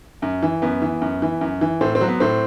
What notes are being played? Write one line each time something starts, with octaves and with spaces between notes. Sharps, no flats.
F#2
E3
F#2 B3
E3
F#2
E3
F#2
E3
A2 C4
C4
F#3
B3
A2 C4